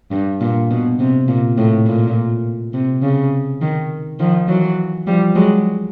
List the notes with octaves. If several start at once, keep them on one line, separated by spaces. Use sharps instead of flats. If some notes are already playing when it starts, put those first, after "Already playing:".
G2
A#2
B2
C3
A#2
A2
A#2
C3
C#3
D#3
D#3 F3
E3 F#3
F3 G3
F#3 G#3